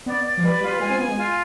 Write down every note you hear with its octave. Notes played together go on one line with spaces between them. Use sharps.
B3 D5
D5
F3
G3 B4
G3 F4
G3
G#3 G#5
C4
B3 G#5
G#3
F4